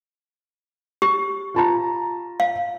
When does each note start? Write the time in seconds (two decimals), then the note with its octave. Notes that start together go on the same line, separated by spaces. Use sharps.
1.02 G4
1.54 F4 A5 A#5
2.40 F5